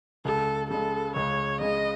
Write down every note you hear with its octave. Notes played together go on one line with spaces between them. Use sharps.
C#2 A4
C#3 G#3 A4
C#2 C#5
C#3 G#3 D#5